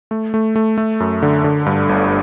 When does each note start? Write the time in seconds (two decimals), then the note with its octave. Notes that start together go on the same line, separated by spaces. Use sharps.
0.11 A3
0.34 A3
0.56 A3
0.78 A3
1.00 F#2
1.22 D3
1.44 D3
1.66 G2
1.89 G1